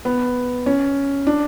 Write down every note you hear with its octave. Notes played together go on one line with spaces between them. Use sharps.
B3
C#4
D4